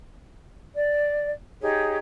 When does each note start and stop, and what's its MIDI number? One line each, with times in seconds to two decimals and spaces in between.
0.76 1.30 74
1.61 1.96 63
1.61 1.96 67
1.61 1.96 68
1.61 1.96 73